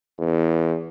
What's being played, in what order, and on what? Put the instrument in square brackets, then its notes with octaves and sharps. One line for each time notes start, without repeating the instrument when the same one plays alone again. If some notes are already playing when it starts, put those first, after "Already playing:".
[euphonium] E2